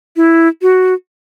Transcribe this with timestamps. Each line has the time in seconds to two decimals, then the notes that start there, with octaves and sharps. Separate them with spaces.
0.16 E4
0.62 F#4